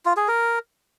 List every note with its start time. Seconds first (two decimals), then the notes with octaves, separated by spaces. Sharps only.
0.06 F4
0.17 G#4
0.28 A#4